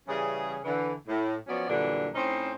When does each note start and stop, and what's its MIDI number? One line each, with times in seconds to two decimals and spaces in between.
0.08 0.58 49
0.08 0.58 52
0.08 0.58 55
0.08 0.58 61
0.08 0.58 68
0.65 0.93 50
0.65 0.93 52
1.07 1.34 45
1.48 1.67 53
1.48 1.67 54
1.48 1.67 59
1.48 1.67 61
1.48 1.67 73
1.48 1.67 74
1.68 2.08 42
1.68 2.08 46
1.68 2.08 50
1.68 2.08 52
1.68 2.08 55
1.68 2.08 62
2.15 2.53 45
2.15 2.53 60
2.15 2.53 61
2.15 2.53 63
2.15 2.53 72